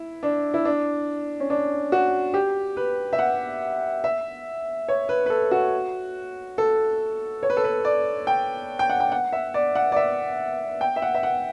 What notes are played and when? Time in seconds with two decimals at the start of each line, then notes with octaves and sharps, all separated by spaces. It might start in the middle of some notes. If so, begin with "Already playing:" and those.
Already playing: E4
0.23 D4
0.54 E4
0.65 D4
1.40 C#4
1.50 D4
1.92 F#4
2.34 G4
2.77 B4
3.13 E5
3.19 F#5
4.04 E5
4.88 C#5
5.09 B4
5.26 B4
5.30 A4
5.51 F#4
6.58 A4
7.43 C#5
7.50 B4
7.57 A4
7.64 B4
7.85 D5
8.27 G5
8.79 G5
8.90 F#5
9.00 G5
9.12 F#5
9.32 E5
9.54 D5
9.75 F#5
9.92 D5
9.96 E5
10.81 G5
10.96 E5
11.02 F#5
11.14 E5
11.23 F#5